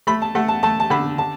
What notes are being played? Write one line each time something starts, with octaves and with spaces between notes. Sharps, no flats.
A3 B5
A5
A3 F#5
A5
A3 A5
A5
D3 B5
D3 A5